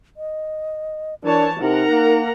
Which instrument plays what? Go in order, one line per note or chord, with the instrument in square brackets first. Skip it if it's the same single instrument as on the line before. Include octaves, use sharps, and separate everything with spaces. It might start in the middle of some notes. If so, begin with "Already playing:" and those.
[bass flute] D#5
[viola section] E3 C#5 A5 [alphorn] D4 [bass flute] A#4
[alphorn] C3 [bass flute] D#4 [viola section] A#4 F#5 A#5
[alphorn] A#3